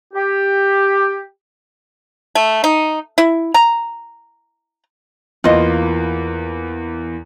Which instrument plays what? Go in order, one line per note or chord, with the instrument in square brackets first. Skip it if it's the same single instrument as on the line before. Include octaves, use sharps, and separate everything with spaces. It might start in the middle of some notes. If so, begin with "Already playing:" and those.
[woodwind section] G4
[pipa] A3
D#4
E4
A#5
[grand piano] E2 A#3 B4 [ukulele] F4 D#5